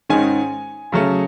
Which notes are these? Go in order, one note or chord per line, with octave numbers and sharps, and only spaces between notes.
G#2 D#3 G#3 C#4 G#5
C#3 F#3 A3 C#4